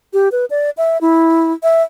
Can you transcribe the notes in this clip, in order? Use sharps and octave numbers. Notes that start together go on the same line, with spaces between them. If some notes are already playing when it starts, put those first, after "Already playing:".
G4
B4
D5
E5
E4
E5